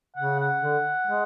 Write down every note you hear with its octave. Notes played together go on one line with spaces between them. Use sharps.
C#3 F#5
F#5
D3
G#3